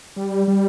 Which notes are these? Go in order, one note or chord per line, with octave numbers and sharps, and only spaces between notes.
G3
G3